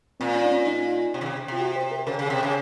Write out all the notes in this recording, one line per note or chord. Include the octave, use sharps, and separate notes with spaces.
A#2 C4
C#4
D#4
C#4
D#4
C3
C#3
C3
C3 F4
F#4
C5
A#4
C#3 A#4
C#3
C3
C#3